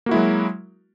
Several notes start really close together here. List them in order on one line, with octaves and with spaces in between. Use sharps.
A#3 F#4 E4 G#3 F#3